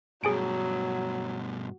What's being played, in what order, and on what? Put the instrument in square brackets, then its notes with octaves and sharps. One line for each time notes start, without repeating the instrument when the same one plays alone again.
[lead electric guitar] G2 B2 [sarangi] F#3 [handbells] G#4 G#5 D7